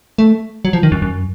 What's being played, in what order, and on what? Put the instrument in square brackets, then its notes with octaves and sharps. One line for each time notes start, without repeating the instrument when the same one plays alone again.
[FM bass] A3
F#3
F3
D#3
F#2
F#2